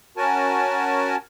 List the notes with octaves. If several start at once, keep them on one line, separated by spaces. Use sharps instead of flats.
C#4 F#4 A#4 G#5 A5